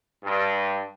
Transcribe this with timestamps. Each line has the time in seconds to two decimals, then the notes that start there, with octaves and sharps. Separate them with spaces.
0.23 G2